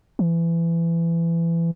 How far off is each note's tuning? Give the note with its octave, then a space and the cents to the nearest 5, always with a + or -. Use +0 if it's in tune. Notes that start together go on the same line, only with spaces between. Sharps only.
E3 +25